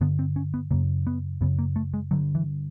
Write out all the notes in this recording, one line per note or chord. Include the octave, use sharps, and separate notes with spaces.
G2 D3 B3
C4
C#4
B3
F#2 C#3 A#3
B3
F#2 C#3 B3
A#3
A3
G#3
G2 D3 F#3
E3